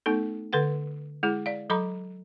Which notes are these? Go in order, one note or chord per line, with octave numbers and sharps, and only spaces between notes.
A3 B3 D#4 A4
D3 A4 B4 F#5
G#3 E4 G#4
D5 F5
F#3 A4 A#5 B5 D6